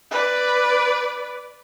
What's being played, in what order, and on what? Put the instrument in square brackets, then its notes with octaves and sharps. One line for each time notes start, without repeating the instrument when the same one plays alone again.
[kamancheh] B4 D5